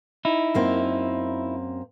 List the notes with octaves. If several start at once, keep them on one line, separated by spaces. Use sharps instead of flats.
D#4 E4
F#2 A#3 C4